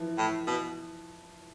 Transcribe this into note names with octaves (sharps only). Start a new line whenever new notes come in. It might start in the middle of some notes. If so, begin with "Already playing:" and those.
Already playing: E3 F3
A2
B2